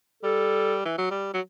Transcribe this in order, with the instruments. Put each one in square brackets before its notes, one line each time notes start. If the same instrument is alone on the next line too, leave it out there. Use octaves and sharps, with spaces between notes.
[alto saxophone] G3 [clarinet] A4
[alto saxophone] E3
F#3
G3
F#3